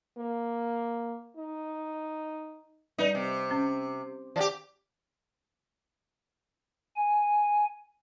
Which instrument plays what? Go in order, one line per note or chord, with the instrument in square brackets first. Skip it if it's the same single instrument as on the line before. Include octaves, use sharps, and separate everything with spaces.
[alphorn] A#3
D#4
[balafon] G3 B4 D5 [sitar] D#4
[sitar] C3
[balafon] C#4
[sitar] F3 G4 [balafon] D5
[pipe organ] G#5